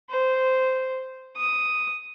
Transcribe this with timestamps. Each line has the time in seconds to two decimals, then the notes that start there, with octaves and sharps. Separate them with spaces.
0.10 C5
1.37 D#6